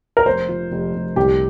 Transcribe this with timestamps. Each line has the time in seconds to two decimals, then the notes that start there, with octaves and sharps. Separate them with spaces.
0.17 A#4
0.26 F1 C5
0.48 F3
0.72 F1
0.94 F1
1.16 C2 G4